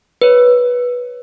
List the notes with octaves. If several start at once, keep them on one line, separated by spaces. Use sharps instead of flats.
B4 C#5